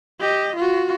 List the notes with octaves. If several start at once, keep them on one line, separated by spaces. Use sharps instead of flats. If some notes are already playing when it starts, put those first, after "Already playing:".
G4 D#5
F4 F#4